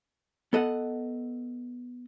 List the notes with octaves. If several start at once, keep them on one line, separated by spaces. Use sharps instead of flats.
B3 A4 D#5 F#5